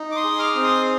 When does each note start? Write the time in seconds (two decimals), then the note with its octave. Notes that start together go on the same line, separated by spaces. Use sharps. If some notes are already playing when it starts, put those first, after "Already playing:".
Already playing: D#4
0.11 D6
0.16 C6 D#6
0.24 G#4
0.39 D6 F6
0.55 C4
0.63 C6 D#6